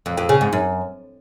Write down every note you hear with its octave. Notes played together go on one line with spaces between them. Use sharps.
F2
F2
C#3
G#2
F#2